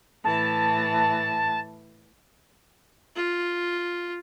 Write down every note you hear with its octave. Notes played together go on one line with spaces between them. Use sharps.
A2 E3 A5
F4